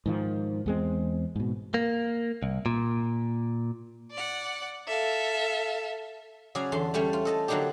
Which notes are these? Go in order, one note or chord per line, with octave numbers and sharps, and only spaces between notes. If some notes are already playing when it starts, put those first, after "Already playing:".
G#2 D#3 F3
E2 G#3 C4
G#2 B2
A#3
C2
A#2
D5 F#5
A4 E5 F5
C#3 F#3 G#4 D5 F5 G#5
E2 D3 A5 C6
G3 A3 C#4 C#5
F4
A4 D#5 A5
D3 F#3 A#3 D4 D#4 G4